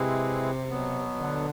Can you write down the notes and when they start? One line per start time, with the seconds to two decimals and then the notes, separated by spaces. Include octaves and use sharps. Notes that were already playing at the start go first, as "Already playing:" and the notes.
Already playing: C3 G#3 C4 E4 G#4 B4
0.70 B2 F#3 B3
1.18 D3